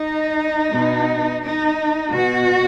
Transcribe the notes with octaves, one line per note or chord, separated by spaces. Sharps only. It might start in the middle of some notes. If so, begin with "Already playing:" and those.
Already playing: D#4
B2
D#4
B2 F#4